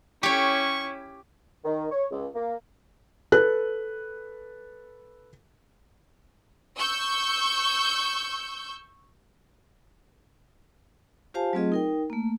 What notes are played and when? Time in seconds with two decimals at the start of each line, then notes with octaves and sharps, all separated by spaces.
0.23 C#4 E4 G4 C#5 C#6
1.65 D#3
1.91 C#5
2.11 C#2
2.35 A#3
3.32 A4 B4 F#6
6.77 C#6 E6 G6
11.34 F4 G4 C5 F5 G#5 A5
11.53 F#3 A3 C4 F4 G#4 D#5
11.72 D#4 A#4 G5
12.10 A3 A#3